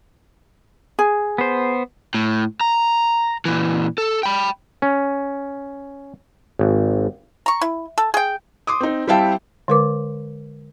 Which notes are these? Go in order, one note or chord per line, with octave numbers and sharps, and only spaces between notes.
G#4
B3 C5
A2
A#5
A#2 E3
A4
G5 B5
C#4
G#1
A#5 C#6
E4
A4
G#4 G5
C6 D6 D#6
C4 D#4
G3 C4 E4 F5 G5 A5
D3 G#3 A#4 B4 D6